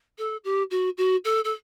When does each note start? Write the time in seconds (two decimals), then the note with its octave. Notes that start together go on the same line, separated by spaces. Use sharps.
0.18 A4
0.44 G4
0.71 F#4
0.98 F#4
1.25 A4
1.44 A4